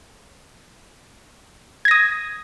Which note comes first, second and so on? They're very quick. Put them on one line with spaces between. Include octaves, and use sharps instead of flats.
G#6 A#6 D#6